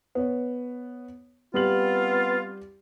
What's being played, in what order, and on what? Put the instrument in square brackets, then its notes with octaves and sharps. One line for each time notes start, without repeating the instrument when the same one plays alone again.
[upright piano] B3 C#5
[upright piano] G3 G4 F#7 [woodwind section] B3 C4 F4